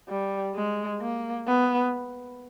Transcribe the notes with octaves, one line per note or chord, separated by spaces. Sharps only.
G3
G#3
A#3
B3